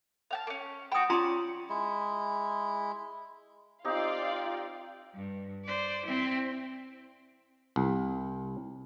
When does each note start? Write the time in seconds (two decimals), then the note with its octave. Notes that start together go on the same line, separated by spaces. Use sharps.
0.31 F5 G5 A5
0.47 A#3 C#4
0.92 F#4 G5 B5 D#6
1.10 C#4 F4 D5 A#5 C6
1.69 G#3 E4
3.85 C4 D#4 F4 G4 D5 F5
5.14 G2
5.64 C5 D5
6.05 C4 E4
7.76 C2